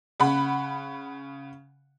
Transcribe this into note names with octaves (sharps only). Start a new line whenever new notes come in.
C#3 F#5 B5